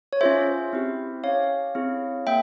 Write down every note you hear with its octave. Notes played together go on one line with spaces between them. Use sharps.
C#5
C#4 F4 G#4 C5 E5
C4 E4 G4
C#4 G4 C#5 F5
C4 E4 G#4
A#3 E5 G5